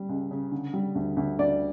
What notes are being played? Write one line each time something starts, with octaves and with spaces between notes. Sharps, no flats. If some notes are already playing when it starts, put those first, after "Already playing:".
Already playing: G3
C#2
C#3
D3
G3
D2
D2
D2 D5